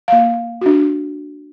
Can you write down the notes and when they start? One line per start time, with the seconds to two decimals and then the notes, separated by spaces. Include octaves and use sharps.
0.08 A#3 F5
0.61 D4 F#4